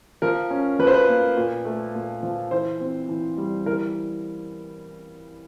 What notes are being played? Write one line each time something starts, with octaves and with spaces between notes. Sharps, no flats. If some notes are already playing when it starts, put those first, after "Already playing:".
F3 A#4
C#4
F3 B4
C5
B4
A#3
A#2
A3
A#2
F3
E3 C5
C4
E3
G3
E3 A#4